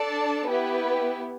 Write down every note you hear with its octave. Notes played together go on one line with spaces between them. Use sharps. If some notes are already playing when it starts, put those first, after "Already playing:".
Already playing: D4 A4 D5 A5
B3 E4 G4 B4